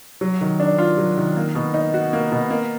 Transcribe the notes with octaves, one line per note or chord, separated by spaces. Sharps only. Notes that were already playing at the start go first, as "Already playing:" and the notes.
F#3
D#3
D4
F4
F#3
D#3
A#3
B2
D#4
F#4
A#3
B2
A#3